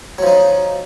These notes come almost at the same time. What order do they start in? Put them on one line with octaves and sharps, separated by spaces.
F#3 F3 D#4